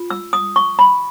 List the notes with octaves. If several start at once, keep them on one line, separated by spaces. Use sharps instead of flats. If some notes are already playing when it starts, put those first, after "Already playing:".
Already playing: F4
E6
D#6
C#6
B5